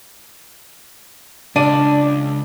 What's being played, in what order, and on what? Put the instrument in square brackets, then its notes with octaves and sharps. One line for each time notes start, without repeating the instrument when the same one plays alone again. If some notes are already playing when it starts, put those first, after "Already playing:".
[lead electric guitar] C#2 [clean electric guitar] D4 [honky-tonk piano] D5 D#7